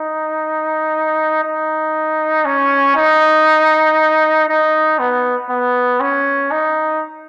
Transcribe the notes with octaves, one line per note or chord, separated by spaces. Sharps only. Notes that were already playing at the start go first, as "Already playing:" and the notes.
Already playing: D#4
D#4
C#4
D#4
D#4
B3
B3
C#4
D#4